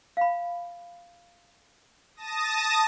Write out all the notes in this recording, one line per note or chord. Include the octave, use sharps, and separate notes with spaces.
F5 B5
A5 D#6 A#6